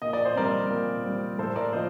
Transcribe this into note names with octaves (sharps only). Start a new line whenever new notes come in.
A#2 D#5
D5
C5
G3 C4 A#4 D5
A#2
G3 C4
A2 A4 C5
A#4 D5
F3 A#3 C5 D#5